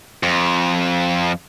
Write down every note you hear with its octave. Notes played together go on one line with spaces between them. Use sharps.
F2